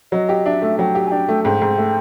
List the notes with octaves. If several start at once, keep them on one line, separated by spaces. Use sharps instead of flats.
F#3 D#5
G4
D4 E5
A3
F#3 G5
G4
G#5
D4 G5
A3
G#2 G5
G#2
A3